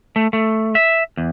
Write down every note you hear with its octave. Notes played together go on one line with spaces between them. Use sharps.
A3
A3
E5
E2